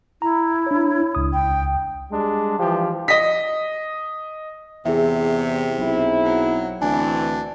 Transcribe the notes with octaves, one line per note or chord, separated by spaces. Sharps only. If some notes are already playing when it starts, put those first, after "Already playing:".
E4 A#5
D4 C#5
C#2 D#6
G5
G3 G#3 D4
E3 F3 G4
D#5 B6
E2 C3 G#4 E5
B1 C4 E4
F#3
D2 B2 E3 C4 D4 G#5